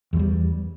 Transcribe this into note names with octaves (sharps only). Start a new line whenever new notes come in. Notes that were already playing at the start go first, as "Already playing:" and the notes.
E2 F#3 G3